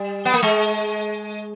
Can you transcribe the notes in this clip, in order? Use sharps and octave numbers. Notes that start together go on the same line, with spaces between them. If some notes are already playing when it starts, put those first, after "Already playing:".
Already playing: G3
B3
A#3
G#3